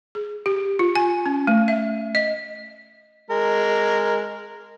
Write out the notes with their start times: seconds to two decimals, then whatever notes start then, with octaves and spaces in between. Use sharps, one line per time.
0.15 G#4
0.46 G4
0.79 F4
0.95 G#5
1.26 C#4
1.47 A3
1.68 E5
2.15 D#5
3.30 G#3 A#4